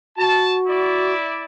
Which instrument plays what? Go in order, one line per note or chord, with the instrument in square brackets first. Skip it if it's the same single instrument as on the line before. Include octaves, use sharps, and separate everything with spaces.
[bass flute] F#4 [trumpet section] A5
[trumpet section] E4 D5